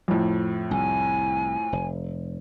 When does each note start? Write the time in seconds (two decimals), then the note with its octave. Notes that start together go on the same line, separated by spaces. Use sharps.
0.08 F2 A2
0.71 C2 G#5
1.72 F1